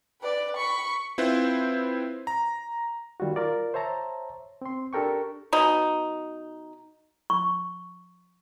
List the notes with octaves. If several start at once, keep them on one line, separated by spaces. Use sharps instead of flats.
B4 D5
B5 C#6
C4 E4 F4 B4 C5
A#5
D#3 G3 F4 F#4
F4 A#4 D5
C5 C#5 E5 A5 A#5
C4 C6
D4 G4 A4 A#4 G5 C#6
B2 D#4
C#6